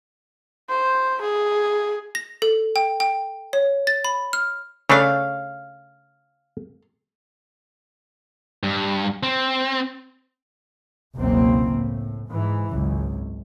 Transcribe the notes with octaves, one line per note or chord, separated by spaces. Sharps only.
C5
G#4
A#6
A4
G5
G5
C#5
A6
B5
F6
C#3 A3 D4 C#5 F5
G2
C4
F#1 C#2 B2 E3 A#3 C4
A2
G#2 E3
G#1 C#2 F#2